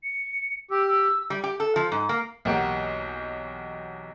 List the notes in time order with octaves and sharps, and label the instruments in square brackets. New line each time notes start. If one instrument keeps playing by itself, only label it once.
[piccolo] C#7
[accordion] G4 [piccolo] E6
[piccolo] E6
[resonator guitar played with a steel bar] G3
G4
A4
F3
G#2
A#3
[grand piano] B1 E2 A#3 G4 F#5 D7